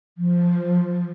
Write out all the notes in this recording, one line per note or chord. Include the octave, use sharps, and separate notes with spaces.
F3